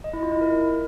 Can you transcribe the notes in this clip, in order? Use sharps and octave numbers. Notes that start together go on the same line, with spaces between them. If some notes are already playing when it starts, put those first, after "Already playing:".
D#5
E4
F4
E4
A#4